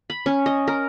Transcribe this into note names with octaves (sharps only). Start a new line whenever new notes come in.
B5
C#4
D#5
A#4